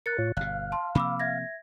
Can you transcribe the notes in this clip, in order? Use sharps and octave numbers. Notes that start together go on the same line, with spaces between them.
A#4 F#6 A6 C#7
A2 F4 C#5
G1 B2 F5 F#6
A5 C6
C3 F3 A#3 B5 D6 E6
E5 G#6 A#6